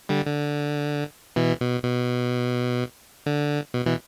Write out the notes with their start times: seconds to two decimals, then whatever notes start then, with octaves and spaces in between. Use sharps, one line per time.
0.09 D3 G3
0.26 D3
1.36 B2 E3
1.61 B2
1.84 B2
3.26 D3
3.74 B2
3.86 B2 E3